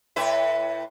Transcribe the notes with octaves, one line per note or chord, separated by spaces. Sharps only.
A2 B4 E5